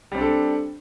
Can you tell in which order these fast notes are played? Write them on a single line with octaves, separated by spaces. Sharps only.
G3 C4 D4 A4